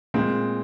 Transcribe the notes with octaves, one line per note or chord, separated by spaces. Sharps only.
A#2 G#3 C4